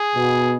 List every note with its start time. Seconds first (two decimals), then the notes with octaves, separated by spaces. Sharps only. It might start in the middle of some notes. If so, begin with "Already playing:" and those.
Already playing: G#4
0.16 B2